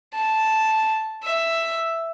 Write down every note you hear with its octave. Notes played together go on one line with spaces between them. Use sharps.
A5
E5